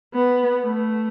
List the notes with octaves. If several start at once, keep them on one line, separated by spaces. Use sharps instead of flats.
B3
A3